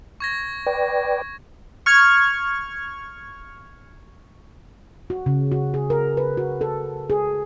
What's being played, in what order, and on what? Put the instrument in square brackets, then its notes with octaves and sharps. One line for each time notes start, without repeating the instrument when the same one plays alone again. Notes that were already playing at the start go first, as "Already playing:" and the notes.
[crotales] C#6 G#6 A#6
[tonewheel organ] B4 D5 G5
[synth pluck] C#6 F6 G#6
[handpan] F#4
C#3
F#4
G#4
A#4
B4
F#4
A4
G#4